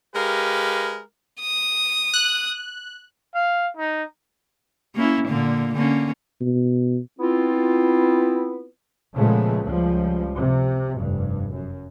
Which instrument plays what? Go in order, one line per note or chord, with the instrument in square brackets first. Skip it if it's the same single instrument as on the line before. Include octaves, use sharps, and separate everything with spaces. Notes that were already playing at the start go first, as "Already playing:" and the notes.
[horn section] G#3 G4 A#4 B4 F5
[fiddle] D#6
[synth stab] F#6
[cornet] F5
D#4
[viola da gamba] A#3 C#4 E4
A#2 D3 A#3
D3 A#3 C#4
[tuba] B2
[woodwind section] B3 C4 E4 F4
[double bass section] A#2 C#3 F3 G#3 A3 B3
C#2 F3 G3
C3
F1 G2
F#2